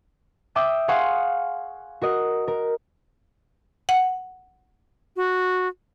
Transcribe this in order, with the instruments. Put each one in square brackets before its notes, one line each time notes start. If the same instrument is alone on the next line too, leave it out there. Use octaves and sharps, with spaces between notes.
[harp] E5 G5 D6 D#6 G6
G#4 F5 F#5 C6 C#6
F#4 A#4 D#5
A#4
[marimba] F#5
[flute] F#4